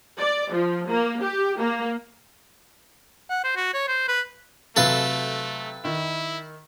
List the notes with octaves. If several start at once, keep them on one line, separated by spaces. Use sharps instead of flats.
D5
F3
A#3
G4
A#3
F#5
C5
F#4
C#5
C5
B4
C3 F#3 A3 A4 B4 F5
D#3 E4